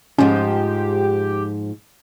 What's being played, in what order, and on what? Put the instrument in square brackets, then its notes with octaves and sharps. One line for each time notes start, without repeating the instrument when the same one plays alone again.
[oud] G#2 F3 [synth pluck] C#4 [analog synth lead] G4